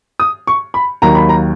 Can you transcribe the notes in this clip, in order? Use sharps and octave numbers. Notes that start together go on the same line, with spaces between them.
D#6
C#6
B5
D#2 D#3 F#3 A#3 A#5
B5
A#5